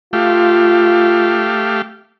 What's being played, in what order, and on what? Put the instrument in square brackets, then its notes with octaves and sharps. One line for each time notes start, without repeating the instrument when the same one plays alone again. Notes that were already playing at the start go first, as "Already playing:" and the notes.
[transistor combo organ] A3 G4 F5 [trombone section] F4